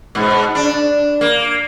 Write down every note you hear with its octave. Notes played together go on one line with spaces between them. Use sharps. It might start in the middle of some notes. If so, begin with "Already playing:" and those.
G#2 B2
D4
A#3